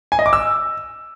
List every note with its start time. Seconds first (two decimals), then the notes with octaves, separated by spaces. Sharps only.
0.12 G#5
0.19 D#5
0.26 D6
0.33 E6